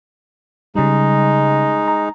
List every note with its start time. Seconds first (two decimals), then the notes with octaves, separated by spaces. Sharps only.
0.76 C#3 G3 G#3 D#4
1.88 A#5